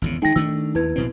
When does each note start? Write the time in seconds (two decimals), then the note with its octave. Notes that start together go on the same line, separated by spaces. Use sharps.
0.02 G#1 E2 C#3
0.22 D#3 G#3 D#4 G5 A#6
0.36 D#3 A3 D4 E6
0.75 D#2 E4 B4 G#6
0.96 A#1 B2 C4